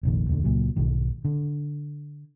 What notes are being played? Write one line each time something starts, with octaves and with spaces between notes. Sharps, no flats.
F1 A#1 D#3
E1 D2 D3
C#2 A#2 F#3
B1 G#2 D#3
D3